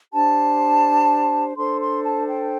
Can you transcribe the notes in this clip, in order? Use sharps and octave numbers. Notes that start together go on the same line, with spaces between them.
D4 G4 C5 A5
D4 A4 C5 C6
C6
A5
G5